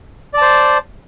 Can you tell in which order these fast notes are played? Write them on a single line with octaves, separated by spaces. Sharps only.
D5 A5 C5